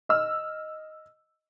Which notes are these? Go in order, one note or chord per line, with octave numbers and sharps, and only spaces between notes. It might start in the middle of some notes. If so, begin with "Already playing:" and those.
D#5 E6 F6